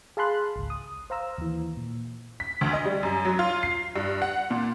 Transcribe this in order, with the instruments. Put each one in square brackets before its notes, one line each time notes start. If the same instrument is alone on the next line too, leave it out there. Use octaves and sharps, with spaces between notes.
[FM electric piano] G#4 F5 A5 B5 C6 F#6
G#1 C#2
D#6
C5 F5 A#5 E6
D#2 E3
A#2
[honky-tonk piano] B6
D2
D#5
G3
F#2
F#3
F4
C7
G2
F#5
A#2